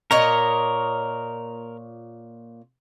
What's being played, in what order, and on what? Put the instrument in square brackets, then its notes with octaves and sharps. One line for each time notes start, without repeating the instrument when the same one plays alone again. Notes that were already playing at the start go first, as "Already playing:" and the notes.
[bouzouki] A#2 C#5 D#5 [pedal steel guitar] A#4